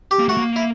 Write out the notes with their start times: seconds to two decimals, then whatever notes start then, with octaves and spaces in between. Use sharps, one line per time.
0.11 G4
0.19 A#3
0.28 A3 F#4
0.37 A#3
0.56 E4